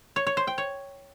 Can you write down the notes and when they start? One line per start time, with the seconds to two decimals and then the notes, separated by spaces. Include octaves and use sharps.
0.16 C#5
0.27 C#5
0.37 C5
0.47 G5
0.58 C#5